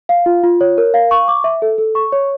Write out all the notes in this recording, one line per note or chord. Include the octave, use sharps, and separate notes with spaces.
F5
F4
F4
C#5
A#4
F5
C#6
D6
E5
A4
A4
C#6
C#5